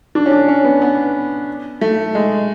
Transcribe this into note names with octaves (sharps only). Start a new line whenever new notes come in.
D4
C#4
D4
C#4
B3
B3
A3
G#3